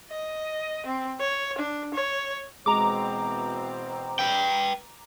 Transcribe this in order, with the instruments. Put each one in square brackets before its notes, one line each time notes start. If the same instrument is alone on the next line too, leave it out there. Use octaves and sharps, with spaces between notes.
[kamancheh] D#5
C4
C#5
D4
C#5
[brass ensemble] B2 E3 C4 [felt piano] G#3 [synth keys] A#5 D6
[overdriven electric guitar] B4 G5